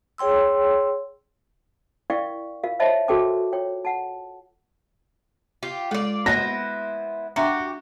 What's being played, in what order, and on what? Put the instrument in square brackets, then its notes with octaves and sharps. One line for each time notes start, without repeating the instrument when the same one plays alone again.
[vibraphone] G#4 C#5 G5 C6 E6
[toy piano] E4 A#4 D5 F5 G5 C#6
F4 A#4 F5
C5 C#5 D#5 E5 A5 B5
F#4 A4 A#4 G5 A5 D6
F4 C#5 G5
F#5 A5
[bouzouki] F4 G4
[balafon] G#3 A4 [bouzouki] F4 D5
[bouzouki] B3 E4 C5 [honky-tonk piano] A#6
[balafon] D4 E5 A#5 [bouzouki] F#4 G4